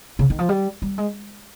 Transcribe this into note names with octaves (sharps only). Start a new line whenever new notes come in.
C#3
D#3
F3
G3
G3
G#3